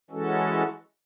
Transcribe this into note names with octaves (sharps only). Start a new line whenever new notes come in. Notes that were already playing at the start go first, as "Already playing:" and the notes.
E3 G#3 C#4 F#4 A4